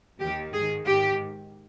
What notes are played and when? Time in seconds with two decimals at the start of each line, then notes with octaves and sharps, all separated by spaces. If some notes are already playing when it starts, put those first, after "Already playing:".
0.20 D#2 D#3 G4
0.53 G#2 D#3 G#4
0.87 G#2 D#3 G4